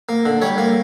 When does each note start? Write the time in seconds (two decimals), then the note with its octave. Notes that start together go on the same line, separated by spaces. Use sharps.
0.09 A#3
0.26 D3
0.42 G3 C#5
0.58 A#3